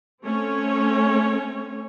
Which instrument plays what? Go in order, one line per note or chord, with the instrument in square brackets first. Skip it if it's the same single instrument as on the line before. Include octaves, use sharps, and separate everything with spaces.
[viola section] A3 C4 C#4 C#5